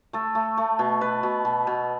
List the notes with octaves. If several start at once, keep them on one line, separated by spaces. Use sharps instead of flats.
A3 A4
A3
A3
B2
B2 B4
B2
B2
B2